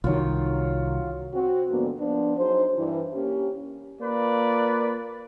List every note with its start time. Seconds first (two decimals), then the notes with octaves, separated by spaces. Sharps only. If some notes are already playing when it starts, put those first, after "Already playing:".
0.04 C2 D#3 F#3 F4
1.34 C4 F#4
1.70 G#2 D3 F3 A#3 B3 D4
1.99 F3 B3 D4
2.38 F#3 D#4 G#4 C5
2.77 G2 E3
3.14 A#3 C#4 G4
4.01 A#3 F4 B4 D5